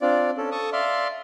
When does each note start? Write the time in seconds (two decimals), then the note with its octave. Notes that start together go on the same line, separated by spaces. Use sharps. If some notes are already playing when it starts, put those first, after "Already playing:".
0.01 C4 D4 F4 D5
0.38 C#4 A4
0.52 A4 A5 C#6 D#6
0.72 D5 E5 F5 C6